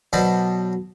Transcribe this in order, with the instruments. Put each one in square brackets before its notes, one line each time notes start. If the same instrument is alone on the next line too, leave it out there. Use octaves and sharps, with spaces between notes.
[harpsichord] B2 F#3 C5 D5 A5 B5